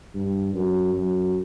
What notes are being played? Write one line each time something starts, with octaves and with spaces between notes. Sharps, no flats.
G2
F#2
F#2